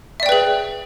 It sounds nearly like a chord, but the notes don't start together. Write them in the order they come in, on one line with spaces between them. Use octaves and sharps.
E5 D5 G5 B4 G#4